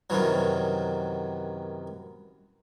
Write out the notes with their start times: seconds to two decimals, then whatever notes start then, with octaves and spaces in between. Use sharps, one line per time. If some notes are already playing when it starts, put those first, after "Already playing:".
0.10 F#2 C3 D#3 E3 F#3